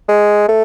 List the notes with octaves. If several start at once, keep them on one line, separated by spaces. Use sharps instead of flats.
G#3
A3